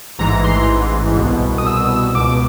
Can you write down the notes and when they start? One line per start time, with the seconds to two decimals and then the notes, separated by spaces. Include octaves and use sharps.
0.19 A1 G#2 E3 A#5
0.44 C6
1.17 C2 B2
1.58 D#6
1.67 E6
2.14 C#2 B2 D6